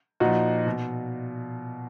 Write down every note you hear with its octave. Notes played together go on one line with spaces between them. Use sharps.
A#2 F3 D#4 F#4
B2